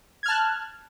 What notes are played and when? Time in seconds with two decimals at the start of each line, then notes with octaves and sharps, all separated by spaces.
0.23 G#6
0.26 F6
0.28 A5
0.31 F#6